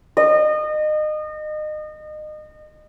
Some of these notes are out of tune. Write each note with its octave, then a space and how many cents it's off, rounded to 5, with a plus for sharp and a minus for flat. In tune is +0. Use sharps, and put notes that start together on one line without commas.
D#5 -30